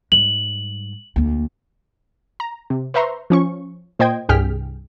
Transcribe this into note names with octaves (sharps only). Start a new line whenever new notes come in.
G#2 G3 F#7
D2 A#3
A#5
C3
B4 C5 E5 A#5 C6 C#6
F3 C#4 C#6
A#2 C5 D#5 G5 G#6
C2 G2 G#4 G5 F6 B6